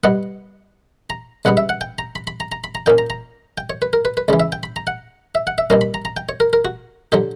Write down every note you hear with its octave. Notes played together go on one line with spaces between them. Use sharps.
B2 G3 B3 F#5
A#5
C#2 B2 G3 B3 F#5
E5
F#5
G5
A#5
B5
B5
A#5
A#5
B5
A#5
A#2 A#3 C#4 G5
A#5
A#5
G5
C#5
B4
A#4
B4
B4
C#2 C#3 E3 D5
E5
G5
B5
A#5
F#5
E5
F#5
E5
B2 G3 A#3 C#4 A#5
B5
A#5
A#5
G5
C#5
A#4
A#4
F#4
D3 F#3 G4